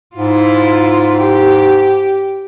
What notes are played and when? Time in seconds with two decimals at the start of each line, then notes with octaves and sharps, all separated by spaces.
0.17 G#2 E4 F4
1.16 G4